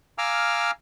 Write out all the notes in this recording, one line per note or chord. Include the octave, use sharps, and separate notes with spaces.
F5 G#5 A#5 D6 E6 F6